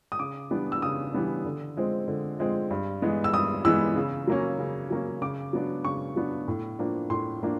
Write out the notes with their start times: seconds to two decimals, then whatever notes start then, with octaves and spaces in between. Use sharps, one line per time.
0.12 D#6
0.19 C#3 D6
0.51 E3 G3 B3 D4
0.72 E6
0.82 C#3 D#6
1.14 E3 G3 B3 D4
1.45 D3
1.77 F3 G#3 C4
2.08 D3
2.39 F3 G#3 C4
2.71 G2
3.02 E3 G#3 B3
3.24 E6
3.34 G2 D#6
3.65 E3 G#3 B3 E6
3.96 C#3
4.27 F#3 A#3 C#4
4.59 C#3
4.90 F#3 A#3 C#4
5.22 C#3 D6
5.53 F#3 B3 D4
5.85 C#3 C#6
6.16 F#3 B3 D4
6.48 A2
6.79 F3 A#3 D4
7.10 A2 C6
7.42 F3 A#3 D4